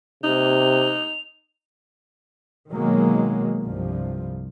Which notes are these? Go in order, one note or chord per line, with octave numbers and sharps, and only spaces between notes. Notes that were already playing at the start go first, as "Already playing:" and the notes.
C3 D#4 F7
B2 D#3 F#3 G#3 A#3
C2 G2 F3